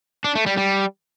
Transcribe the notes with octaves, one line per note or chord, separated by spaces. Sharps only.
D4
A3
G3
G3